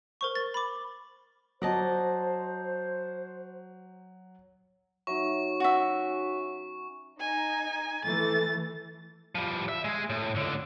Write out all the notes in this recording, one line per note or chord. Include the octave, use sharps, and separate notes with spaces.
A#4 C5 C#6
A6
B5 D6
F#3 C5 D5 D#5 A5
F#3 D#4 C#5 E5 C#6
C#4 F#4 E5
D#4 G#5
E3 A3 A6
F3 G3
E5
G#3 G#4
A2
C#2 D3